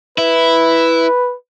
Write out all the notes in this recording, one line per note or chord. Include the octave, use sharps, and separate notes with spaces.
E4 B4